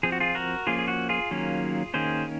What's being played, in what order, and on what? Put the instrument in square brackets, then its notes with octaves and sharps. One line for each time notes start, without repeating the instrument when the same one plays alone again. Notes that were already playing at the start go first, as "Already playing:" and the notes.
[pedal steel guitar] F3 C4 G#4
F#4
F4 G#4
F#4 A#4
F3 A#3 C#4 F4 G#4
G#4
F#4
F4 G#4
D#3 F#3 A#3 C#4
D#3 A#3 C#4 G#4 C5